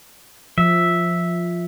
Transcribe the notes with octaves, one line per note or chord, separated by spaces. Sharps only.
F3 E5